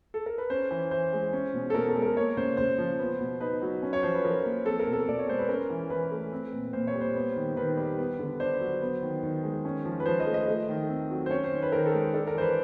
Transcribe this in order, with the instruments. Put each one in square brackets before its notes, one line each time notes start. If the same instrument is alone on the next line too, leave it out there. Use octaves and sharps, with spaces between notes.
[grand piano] A4
A#4
B4
C#4 C5
E3
E3 C5
G#3
C#4
B2
A4
B2 A#4
A4
G#3
A#4
A#3 C#5
C#3 C5
C#3 C5
F3
B3
B2
D#4 B4
F#3
C#4
C#5
F3 C5
B4
F3 A#4
A#3
C4 A4
A#4
B2
A4
B2 D5
C#5
G#3 C5
B4
C#4 A#4
E3
E3 B4
A3
C4
A#2
A#2 C5
C#5
G3
C5
B3
D#3
D#3 B4
G3
B3
D3
D4 C5
F#3
B3
D#3
D#3
G#3
C#4
F3
B4
F3 C5
D#5
A3
D#5
A3
D#3
C4
F#3
C5
C#4 C#5
C5
D#3
B4
D#3 A#4
A4
G#3
D4 A4
A#4
E3 C5
B4